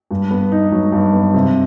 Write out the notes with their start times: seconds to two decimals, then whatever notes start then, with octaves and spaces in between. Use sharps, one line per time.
0.11 G2
0.31 B3
0.52 D#4
0.72 F#3
0.92 G2
1.13 B3
1.34 C3